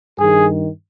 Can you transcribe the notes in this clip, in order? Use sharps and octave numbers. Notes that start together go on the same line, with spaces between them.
G2 D#3 G#4